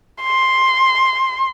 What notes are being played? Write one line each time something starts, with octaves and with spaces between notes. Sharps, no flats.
C6